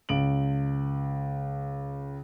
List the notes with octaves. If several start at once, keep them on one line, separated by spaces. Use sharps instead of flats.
C#2 D7 F#7